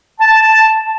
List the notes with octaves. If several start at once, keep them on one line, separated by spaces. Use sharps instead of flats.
A5